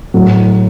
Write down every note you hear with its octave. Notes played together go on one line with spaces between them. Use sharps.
A2 F#3